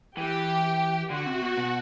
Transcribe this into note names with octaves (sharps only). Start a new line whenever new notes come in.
E3 G4
D3 F#4
C3
B2
B2